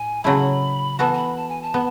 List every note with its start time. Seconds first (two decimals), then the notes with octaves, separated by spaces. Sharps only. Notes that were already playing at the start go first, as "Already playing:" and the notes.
Already playing: A2 G#5
0.24 C#3 F#3 A3 E4 B5
0.99 E3 B3 F#4 A4 A5
1.14 A5
1.17 B5
1.36 A5
1.49 G#5
1.62 A5
1.74 B3